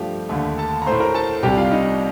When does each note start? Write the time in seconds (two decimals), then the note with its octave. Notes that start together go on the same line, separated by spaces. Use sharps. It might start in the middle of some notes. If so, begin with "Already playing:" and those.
Already playing: G2 F3 A3 G4
0.29 D#2 D3 A3
0.58 A4 A5
0.82 A#5
0.86 A2 A3 C5 C6
1.00 A#4 A#5
1.14 A4 A5
1.43 C2 C3 G3 G4 G5
1.57 F4 F5
1.71 D#4 D#5